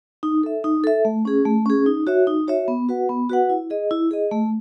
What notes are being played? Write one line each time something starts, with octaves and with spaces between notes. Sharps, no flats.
D#4
A4 E5
D#4
A4 E5
A3
C#4 G#4
A3
C#4 G#4
D#4
F#4 C#5 E5
D#4
F#4 C#5 E5
B3
F#4 B4 F#5
B3
F#4 B4 F#5
E4
G#4 D#5
E4
G#4 D#5
A3